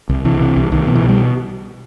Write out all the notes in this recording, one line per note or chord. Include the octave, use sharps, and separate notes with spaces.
C2
C3 E3
C3
C2
C2 D#3
B2
E3
B2
G3